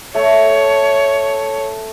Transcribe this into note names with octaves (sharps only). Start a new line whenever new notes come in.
A3 A4 C#5